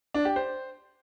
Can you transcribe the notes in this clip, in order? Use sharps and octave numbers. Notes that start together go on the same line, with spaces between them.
D4
G4
C5